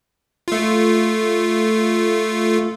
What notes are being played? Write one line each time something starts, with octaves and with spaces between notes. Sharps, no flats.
A3 F4